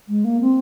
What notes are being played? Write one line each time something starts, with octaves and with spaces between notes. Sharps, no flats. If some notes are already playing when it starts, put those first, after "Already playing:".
G#3
A#3
C4